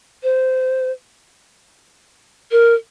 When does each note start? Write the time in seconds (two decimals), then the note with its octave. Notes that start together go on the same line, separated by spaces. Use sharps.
0.23 C5
2.51 A#4